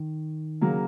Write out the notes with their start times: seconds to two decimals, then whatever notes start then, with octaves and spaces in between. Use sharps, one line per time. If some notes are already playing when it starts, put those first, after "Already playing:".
Already playing: D#3
0.61 C#3 F#3 A#3